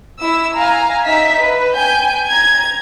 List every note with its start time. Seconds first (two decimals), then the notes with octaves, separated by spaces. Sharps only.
0.20 E4 E6
0.56 F5 G#5 A#5
1.05 D#4 E5 B6
1.41 B4
1.77 G5 G#5 G6
2.27 A#5 G#6